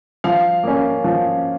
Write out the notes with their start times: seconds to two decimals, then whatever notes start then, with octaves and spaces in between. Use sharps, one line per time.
0.24 F3 F5
0.64 A#3 C#4
1.04 F3